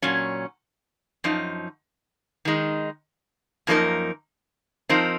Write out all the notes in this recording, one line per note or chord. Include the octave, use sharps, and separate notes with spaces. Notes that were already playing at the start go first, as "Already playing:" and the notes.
A#2 F#3 C#4
F#2 F3 D#4
D#3 G#3 D#4
F#2 F3 A#3 D#4 A#4
F3 C4 D#4 A#4